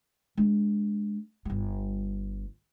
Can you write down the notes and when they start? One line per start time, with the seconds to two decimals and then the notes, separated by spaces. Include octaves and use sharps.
0.37 G#3 D4
1.45 G1 G3